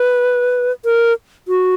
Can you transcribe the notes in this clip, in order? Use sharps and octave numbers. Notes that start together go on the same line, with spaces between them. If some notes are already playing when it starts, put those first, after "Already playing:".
Already playing: B4
A#4
F#4